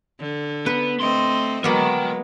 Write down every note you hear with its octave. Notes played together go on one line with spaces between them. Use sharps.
D3
B3 B4
A3 C4 D#5 C6
F#3 G#3 A#3 B3 A#4 G5